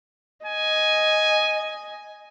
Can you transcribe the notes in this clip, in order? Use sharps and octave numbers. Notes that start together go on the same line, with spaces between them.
D#5 G#5